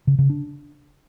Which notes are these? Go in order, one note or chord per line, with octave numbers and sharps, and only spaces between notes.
C#3
C#3
D4